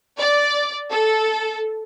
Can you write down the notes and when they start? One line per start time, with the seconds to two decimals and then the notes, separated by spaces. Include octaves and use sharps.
0.19 D5
0.91 A4